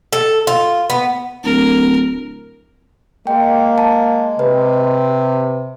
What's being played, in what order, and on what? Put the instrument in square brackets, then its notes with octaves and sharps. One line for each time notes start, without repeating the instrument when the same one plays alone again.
[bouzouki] A4
F4
B3
[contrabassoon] D1 [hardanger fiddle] A#4
[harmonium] G#3 [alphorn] A#3 [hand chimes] G5
[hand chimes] A5
[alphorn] C3 [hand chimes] B4